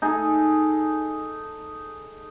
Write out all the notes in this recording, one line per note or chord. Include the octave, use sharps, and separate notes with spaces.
D#4 G#4 A4